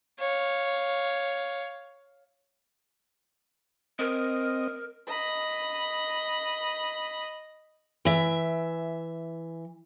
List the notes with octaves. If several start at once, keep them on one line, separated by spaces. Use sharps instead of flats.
C#5 F5
C4 A#4 D#5
D#5 B5
E3 E5